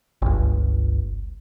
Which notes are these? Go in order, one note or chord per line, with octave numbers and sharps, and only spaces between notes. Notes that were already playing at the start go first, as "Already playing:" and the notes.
G1 C#2